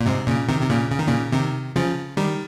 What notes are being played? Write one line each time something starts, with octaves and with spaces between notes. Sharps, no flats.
A#2
G#2 C3
A#2 C#3
C3 D#3
C3
A#2 C#3
C#3
D#3
A#2 C#3
C3 D#3
C#3 F3
D#3 G3